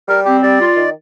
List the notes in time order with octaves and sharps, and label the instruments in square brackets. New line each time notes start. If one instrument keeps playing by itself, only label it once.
[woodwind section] G3 [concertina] A#4
[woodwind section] C4 [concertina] G4
[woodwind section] G3 [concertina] D5
[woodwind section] F4
D#3